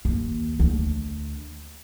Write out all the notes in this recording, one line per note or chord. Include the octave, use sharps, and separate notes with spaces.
D#2
D2